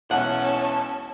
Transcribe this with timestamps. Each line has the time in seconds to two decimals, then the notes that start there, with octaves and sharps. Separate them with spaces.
0.11 E1 B1 C#4 E4 F#5 A5